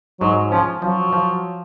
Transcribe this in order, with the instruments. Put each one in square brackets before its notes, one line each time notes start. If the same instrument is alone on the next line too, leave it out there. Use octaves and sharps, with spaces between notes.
[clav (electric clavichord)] G#2 [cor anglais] F#3
[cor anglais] F3 [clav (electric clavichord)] C#4
[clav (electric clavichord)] F3 [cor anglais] F#3
[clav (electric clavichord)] F3